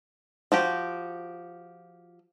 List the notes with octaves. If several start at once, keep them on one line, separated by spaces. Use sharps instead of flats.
F3 F#4 G4